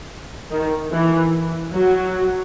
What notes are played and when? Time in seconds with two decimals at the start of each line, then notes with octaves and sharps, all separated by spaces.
0.51 D#3
0.92 E3
1.73 F#3